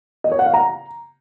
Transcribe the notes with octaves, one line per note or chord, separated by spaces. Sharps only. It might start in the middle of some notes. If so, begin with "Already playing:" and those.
D#5
C#5
F#5
F5
A#5